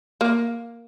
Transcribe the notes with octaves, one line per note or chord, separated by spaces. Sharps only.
A#3